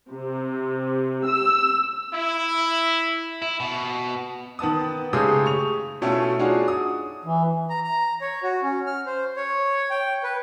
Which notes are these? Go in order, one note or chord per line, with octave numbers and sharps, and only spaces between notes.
C3
E6
E4
E4
B2
D#3 B3 A5 D#6
C#3 G#3 A3 G4 G#4 D#6
C#6 F7
B2 A3 C#4 E4 F4
D4 D#4 F4 F#4 G#4 C#5
D#6
E3
A#5
A#5
C#5
F#4
C#4
F6
C5
C#5
G5
B4